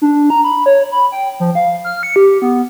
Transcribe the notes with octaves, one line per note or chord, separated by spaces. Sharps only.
D4
A#5
B5
C#5
B5
G5
F3
F5
F6
C#7
G4
B3